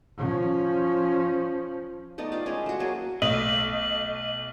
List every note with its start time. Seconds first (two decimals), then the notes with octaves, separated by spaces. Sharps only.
0.17 F3 C#4
2.18 A3 B3 D#4 D5
2.32 F4 G4 D5
2.46 G#3 C#4 G#4 A#4
2.66 A3 F#4
2.80 F#3 A3 A#3 G#4
3.22 B1 A3 D#5 F#7